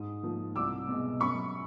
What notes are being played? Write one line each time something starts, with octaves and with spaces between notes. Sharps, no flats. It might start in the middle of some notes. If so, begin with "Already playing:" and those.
Already playing: G#2 D#6
F3 A#3
C2 D6 E6
B2 G#3
F#2 B5 C#6